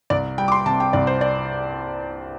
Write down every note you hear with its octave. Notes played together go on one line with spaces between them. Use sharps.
C2 D5
G3 G5
D6
C6
C3 A5
G5
C2 D5
C5
D5